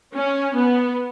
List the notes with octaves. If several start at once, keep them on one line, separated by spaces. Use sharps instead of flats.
C#4
B3